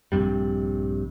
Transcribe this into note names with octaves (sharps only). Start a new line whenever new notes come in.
A#1 G2 C3 G3